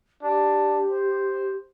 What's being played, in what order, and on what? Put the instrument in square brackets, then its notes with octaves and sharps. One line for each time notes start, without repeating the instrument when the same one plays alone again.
[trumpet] D4 [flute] G4
[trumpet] C5